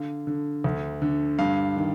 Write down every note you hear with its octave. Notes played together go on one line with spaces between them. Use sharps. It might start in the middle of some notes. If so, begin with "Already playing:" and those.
Already playing: D3 F5
D3
D2
D3
G2 F5
D#3